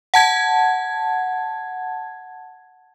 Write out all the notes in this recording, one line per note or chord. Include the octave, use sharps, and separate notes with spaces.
F#5 A5 G#6